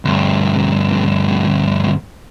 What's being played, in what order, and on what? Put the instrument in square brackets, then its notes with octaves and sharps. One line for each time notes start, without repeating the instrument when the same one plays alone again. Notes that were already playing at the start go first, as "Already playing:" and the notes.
[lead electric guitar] D2 G2